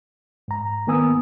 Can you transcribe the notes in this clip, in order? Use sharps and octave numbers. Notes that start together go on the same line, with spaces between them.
G#2 A#5
D#3 A#3 B3 G#5 D#6 E6